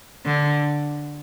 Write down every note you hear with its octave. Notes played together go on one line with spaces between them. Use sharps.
D3